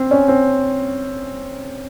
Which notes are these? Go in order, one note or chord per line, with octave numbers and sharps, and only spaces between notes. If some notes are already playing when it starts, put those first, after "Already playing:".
Already playing: C4
C#4
C4